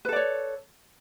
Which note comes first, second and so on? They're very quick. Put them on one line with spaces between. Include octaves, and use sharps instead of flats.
B4 A4 D5 C#5